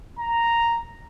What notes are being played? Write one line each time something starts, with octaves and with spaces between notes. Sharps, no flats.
A#5